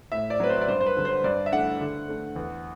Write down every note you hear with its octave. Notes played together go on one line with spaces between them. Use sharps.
A2 E5
D5
F#3 C4 B4
C5
D5
G2 C5
C5
B4
D3 F#3
C5
G2 D5
E5
E3 A3 D4 F#5
D3
A3 D4
E2